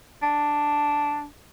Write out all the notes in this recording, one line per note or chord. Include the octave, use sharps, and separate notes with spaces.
D4